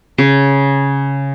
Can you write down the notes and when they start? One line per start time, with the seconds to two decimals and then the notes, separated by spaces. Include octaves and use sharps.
0.18 C#3